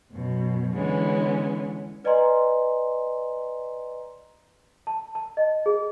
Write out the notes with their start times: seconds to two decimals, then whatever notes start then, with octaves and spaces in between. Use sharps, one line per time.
0.11 F#2 B2
0.74 D3 E3 G#3 B3 C#4
2.04 B4 D5 D#5 G#5 A#5 C6
4.87 A5
5.15 A5
5.37 D#5
5.66 G#4